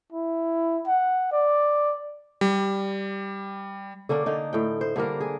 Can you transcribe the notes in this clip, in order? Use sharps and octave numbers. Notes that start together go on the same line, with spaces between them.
E4
F#5
D5
G3
D3 A#3 C#4 D4
D3 D#4
A2 G5
C5
D3 G3 A#3 A#4
G#4